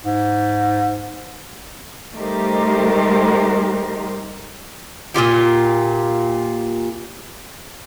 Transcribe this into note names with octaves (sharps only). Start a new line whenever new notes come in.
G#2
G3 A3 D#4 G4 A#4 C5
A#2 D#3 F4 G4